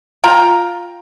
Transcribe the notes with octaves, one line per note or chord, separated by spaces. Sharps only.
F4 G5 A#5